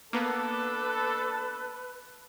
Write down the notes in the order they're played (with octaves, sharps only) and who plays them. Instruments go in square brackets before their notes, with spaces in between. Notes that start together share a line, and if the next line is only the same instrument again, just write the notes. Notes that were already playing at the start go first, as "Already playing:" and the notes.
[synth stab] A#3 B3 [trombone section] D4 A4 [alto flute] B4